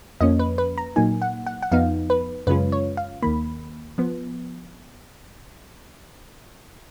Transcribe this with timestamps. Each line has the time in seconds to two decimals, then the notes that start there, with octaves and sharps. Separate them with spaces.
0.21 F2 F3 A#3 C#4 D#5
0.39 B4
0.58 B4
0.78 A#5
0.96 A#2 F#3 A#3 D#4 G#5
1.22 F#5
1.47 F#5
1.63 F#5
1.72 F2 F3 B3 D#4 F5
2.10 B4
2.47 F#2 C#3 G#3 C#4 F4 B4
2.72 C#5
2.97 F5
3.23 D#2 D#3 A#3 B5
3.98 F3 B3